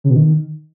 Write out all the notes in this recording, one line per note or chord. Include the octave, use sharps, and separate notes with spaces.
C#3
B2
D#3